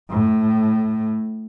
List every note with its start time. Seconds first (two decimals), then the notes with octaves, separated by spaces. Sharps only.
0.10 A2